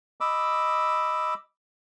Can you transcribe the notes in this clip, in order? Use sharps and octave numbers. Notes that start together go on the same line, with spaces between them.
D#5 B5 D6 E6